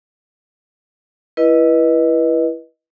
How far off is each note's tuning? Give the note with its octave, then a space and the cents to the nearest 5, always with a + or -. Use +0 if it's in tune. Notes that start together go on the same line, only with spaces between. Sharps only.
E4 +15 B4 -25 D#5 +5